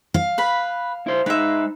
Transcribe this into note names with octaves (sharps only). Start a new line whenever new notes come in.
F5
B4 B5
E4 C5
G#3 D#4 B4 E5